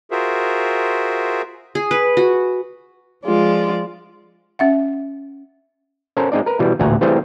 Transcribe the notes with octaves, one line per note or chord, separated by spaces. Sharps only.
F4 F#4 G#4 A#4 C5 E5
G#4
B4
F#4
F3 G#3 F4 D5
C#4 E5 F#5
C#4 A4 A#4 C5
G#3 C4 D#4 D5
A#4 B4
B2 E3 G3
A1 D2 A#2 F#5 G#5 A#5
E3 G3 A3 C4 G#4 C5